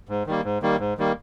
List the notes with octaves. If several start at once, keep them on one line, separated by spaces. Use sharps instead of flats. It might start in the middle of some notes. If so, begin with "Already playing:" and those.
G#2
D#3 G3 A#3
G#2
D#3 G3 A#3
G#2
D#3 G3 A#3